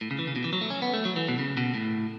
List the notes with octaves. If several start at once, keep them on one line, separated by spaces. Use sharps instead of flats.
A2
C#3
E3
C#3
B2
E3
F#3
A3
C#4
B3
A3
F#3
E3
B2
C#3
B2
A2